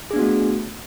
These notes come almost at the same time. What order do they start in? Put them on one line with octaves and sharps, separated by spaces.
G#4 D4 B3 F#4 A3